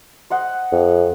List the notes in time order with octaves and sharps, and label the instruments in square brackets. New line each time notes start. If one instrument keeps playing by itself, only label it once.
[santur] C5 D#5 F#5
[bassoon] F2